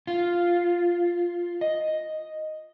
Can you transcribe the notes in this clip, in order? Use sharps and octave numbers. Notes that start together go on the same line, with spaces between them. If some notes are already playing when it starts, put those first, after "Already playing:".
F4
D#5